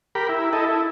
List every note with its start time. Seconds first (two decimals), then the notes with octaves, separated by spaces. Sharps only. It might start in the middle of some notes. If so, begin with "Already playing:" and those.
0.15 G4 A#4 B5
0.29 E4
0.53 E4 A4 D#5
0.65 E4